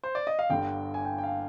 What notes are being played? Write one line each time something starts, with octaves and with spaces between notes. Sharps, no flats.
C5
D5
D#5
F5
G1 G2 D3 G5
G#5
G5
G5
F5